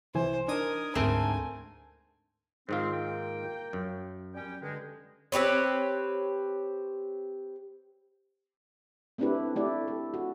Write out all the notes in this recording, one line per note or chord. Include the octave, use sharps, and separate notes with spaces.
C2 E3 C5 G#5
D4 D#4 A#4 G#5 D#6
D2 G#2 A3 C4 A#4 G#5
G#2 D#3 C4 F4
A#3 A#4 G5
F#2
G3 C#4 G5
G2 D3 G#3
C4 G4 B4 C#5
A3 C4 D4 E4 G4 B4
A3 E4 G4 D5
A4
F#4